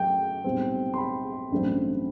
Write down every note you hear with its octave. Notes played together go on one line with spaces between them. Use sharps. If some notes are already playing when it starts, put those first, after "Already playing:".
Already playing: F#2 F#3 A3 G5
B1 A2 G3 C4
C6
B5
A1 G2 F#3 A3 C4